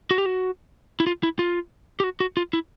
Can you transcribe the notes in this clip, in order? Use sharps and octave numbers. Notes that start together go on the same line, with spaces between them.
F#4
G4
F#4
E4
F4
E4
F4
G4
F#4
F#4
F4
E4